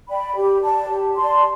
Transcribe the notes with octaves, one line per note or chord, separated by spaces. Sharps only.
D5 G5 B5
G4
D5 A5
G4
D5 A5 C6